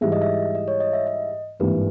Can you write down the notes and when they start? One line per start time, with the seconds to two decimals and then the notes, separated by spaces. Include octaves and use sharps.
0.01 G#2 E3 G3 E5
0.12 D#5
0.22 E5
0.55 D#5
0.68 C#5
0.80 D#5
0.93 E5
1.07 D#5
1.60 G#1 G2 E3 A#3 B4